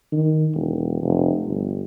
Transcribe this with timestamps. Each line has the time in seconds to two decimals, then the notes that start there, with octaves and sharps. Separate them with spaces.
0.12 D#3
0.54 E1
1.02 F1
1.47 G1